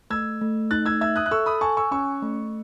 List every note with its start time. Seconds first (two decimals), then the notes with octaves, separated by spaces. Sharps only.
0.10 A3 E6 G#6
0.41 A3
0.71 D#4 F#6 A6
0.86 E6 G#6
1.01 E5 E6 G#6
1.16 D#6 F#6
1.26 F#6
1.31 A4 C#6 E6
1.46 B5 D#6
1.61 G#5 A5 C#6
1.77 C#6 E6
1.91 C#4 C#6 E6
2.22 A3